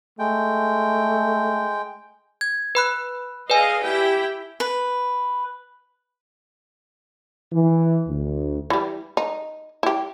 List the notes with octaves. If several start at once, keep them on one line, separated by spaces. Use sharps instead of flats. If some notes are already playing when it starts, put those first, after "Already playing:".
G#3 A3 G5
G#6
B4 B5 F#6
G#4 B4 D5 D#5 F5 G#5
E4 G4 G5
B4
E3
D2
E3 G3
D#4
E4 G4